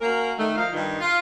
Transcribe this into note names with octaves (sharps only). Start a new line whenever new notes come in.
A#3 C#4 F#4 A#4
D#3 A3
F3 F4 A#4 D#5 F5
G2 D#3
F4